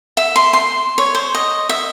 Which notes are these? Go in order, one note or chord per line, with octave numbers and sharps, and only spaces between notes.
E5
C6
C6
C#5
C5
D#5
E5